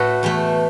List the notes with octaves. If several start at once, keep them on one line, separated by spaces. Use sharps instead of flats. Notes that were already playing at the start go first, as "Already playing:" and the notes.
Already playing: A2 A3 F#4 A4 B4
E2 E3 A3